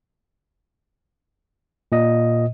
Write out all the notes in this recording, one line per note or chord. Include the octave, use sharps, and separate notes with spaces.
A#2 D#5